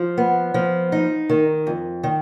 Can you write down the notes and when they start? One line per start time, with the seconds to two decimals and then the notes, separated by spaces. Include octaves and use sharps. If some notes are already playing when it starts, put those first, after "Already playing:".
Already playing: F3
0.18 B3
0.54 F3
0.92 D#4
1.29 D#3
1.67 F2
2.03 D#3